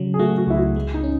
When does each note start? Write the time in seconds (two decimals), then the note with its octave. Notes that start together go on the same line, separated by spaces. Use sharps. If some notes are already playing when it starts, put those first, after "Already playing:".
Already playing: C#3 F#3
0.14 G#4
0.19 A3 F#4
0.38 F#4
0.47 C#2 E4
0.57 F#4
0.76 G#3
0.94 D#4
1.04 C#4